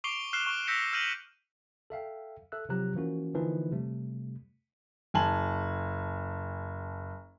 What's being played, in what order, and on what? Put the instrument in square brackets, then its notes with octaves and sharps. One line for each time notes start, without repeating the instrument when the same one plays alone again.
[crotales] C#6 D6 C7 D7 F7 G7
F6 F#6 C7 E7 G7
C#6
E6 G6 A#6 B6 C#7 F7
F6 G6 A#6 D#7 F7 F#7
[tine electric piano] A4 E5 F5 G5
A4 E5 E6 F#6
C3 F3 F#3 G4 A#5 F#6
E3 F3 A#3 C#4 F#4 A#4
D3 E3 F3 A#3 D#4 B4
C3 G3 A3
[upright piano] F#1 G#5 A5 F#7